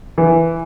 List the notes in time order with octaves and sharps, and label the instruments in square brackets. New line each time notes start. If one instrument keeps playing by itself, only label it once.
[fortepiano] E3